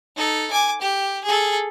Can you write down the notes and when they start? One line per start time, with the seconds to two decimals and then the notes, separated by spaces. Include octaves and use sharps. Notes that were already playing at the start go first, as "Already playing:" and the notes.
0.17 D#4 A4
0.51 G#5 D6
0.82 G4
1.25 G#4 A4